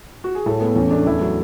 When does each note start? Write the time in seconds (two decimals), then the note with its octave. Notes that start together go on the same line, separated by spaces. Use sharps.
0.24 F#4
0.35 G#4
0.46 A2 A4
0.60 A3 B3
0.76 E2 C#4
0.91 A3 D4
1.06 E2 E4
1.21 F#3